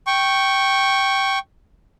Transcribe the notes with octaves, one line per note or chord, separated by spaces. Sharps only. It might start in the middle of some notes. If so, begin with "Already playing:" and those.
G5 C#6